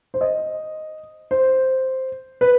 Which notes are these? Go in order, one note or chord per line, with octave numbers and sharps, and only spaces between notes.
C5
D#5
C5
B4